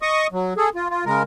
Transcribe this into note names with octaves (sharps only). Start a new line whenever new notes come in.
D#5 C#6 D#6
F#3
G#4 A4
F4
F4
C#3 G#3 A#4